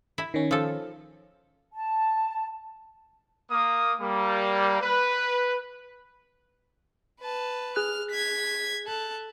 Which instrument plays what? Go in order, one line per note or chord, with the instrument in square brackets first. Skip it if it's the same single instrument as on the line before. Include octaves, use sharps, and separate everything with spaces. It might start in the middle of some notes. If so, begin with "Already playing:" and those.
[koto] E4
[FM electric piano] D#3 C#4
[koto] F3 A4
[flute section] A5
[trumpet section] A#3 D#6
G3 A#3
B4
[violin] B4 A5
[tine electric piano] G#4 F#6 [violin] F6
[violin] G#6 B6
A4 F#6